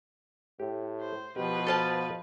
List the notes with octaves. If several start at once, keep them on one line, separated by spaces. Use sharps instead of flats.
A2 G4
C5
B2 F3 G4 B4
F#4 A4 C5 F5 A5